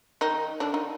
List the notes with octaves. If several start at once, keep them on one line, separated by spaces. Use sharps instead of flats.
D#3 D#4
D3 D4
D#3 D#4